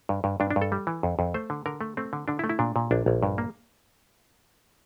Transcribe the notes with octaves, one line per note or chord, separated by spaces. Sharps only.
G2
G2
G2 D4
D4
G2
A4
G3
E3
F2
F2
A3 C5
D3
D3 A#4
A3
A3 C4
D3
D3 D4
E4
A3
E4
A#2 D4
A#2
A#1 D4
A#1
G2
A#3